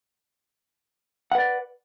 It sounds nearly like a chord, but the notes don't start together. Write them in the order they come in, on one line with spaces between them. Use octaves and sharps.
F#5 B4 D5